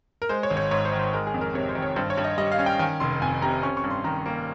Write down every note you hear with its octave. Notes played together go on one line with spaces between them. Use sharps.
A#4
G#3 C5
C#5
G#1
C#5
G#2 C#5
C5
D#3
C5
G#3 A#4
G#4
F2
A#4
C3 C#5
C5
D#3
C#5
G2 C5
C#5
G2
D#5
G3 D#5
F5
C#4
G5
D#3 G#5
F1 C6
F2 G#5
C3 A#5
C#4 C#6
C#6
G2
C6
D#3 A#5
A#3